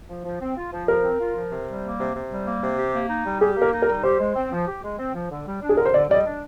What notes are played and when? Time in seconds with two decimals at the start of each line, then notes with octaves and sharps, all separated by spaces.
0.09 F3
0.25 F3
0.41 C4
0.57 F4
0.73 F3
0.88 F3 A#4
1.04 C4
1.20 F4
1.36 F3
1.51 C3
1.67 G3
1.83 A#3
1.99 C3
2.14 C3
2.30 G3
2.46 A#3
2.62 C3
2.77 G4
2.93 A#3
3.09 D#4
3.25 G3
3.41 G4 G#4
3.56 A#3
3.62 A#4
3.72 D#4
3.82 A#4
3.88 G3
4.03 G4 C5
4.20 G#3
4.35 C4
4.52 F3
4.67 G4
4.83 G#3
4.98 C4
5.14 F3
5.30 D3
5.46 G3
5.62 D4
5.69 G#4
5.77 D3 A#4
5.86 C5
5.93 D3 D5
6.09 G3 D5
6.14 D#5
6.25 D4